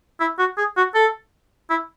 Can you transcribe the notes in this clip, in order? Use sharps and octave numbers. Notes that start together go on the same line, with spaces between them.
E4
F#4
G#4
F#4
A4
E4